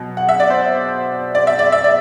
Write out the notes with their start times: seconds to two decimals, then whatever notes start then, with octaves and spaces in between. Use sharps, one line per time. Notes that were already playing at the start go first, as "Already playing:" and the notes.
Already playing: B2 F#3
0.17 F#5
0.29 E5
0.40 D5
0.50 C5
1.35 D5
1.47 E5
1.59 D5
1.72 E5
1.84 D5